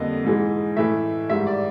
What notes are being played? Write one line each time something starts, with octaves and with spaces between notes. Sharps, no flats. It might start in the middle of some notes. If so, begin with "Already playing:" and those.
Already playing: F2 D3 G3 A#3 D#5
G#2 E3 G#3
A2 E3 A3 E5
G#2 D#3 G3 E5
D5